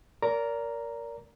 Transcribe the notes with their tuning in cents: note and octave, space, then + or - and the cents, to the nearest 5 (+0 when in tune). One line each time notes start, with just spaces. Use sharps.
A#4 +0 D5 -30 A#5 +0